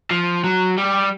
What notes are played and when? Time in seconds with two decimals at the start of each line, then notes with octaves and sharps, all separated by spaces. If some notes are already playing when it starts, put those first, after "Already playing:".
0.11 F3
0.44 F#3
0.78 G3